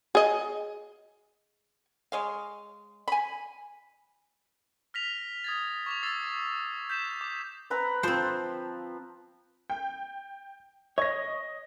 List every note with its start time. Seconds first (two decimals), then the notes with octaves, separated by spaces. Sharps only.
0.15 G#4 D#5
2.12 G#3 C#5 F5
3.08 G#5 B5
4.94 F6 A#6 B6 F7
5.44 D#6 G#6 A6
5.86 C#6 D6 F7
6.03 D6 E6 A6 C7
6.90 G6 B6 E7
7.21 D6
7.70 C4 B4 A#5
8.03 F3 C4 C5
9.70 G5
10.98 C#5 D#5 A#6